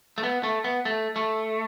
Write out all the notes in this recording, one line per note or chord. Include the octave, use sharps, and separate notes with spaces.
A3
B3
A3
B3
A3
A3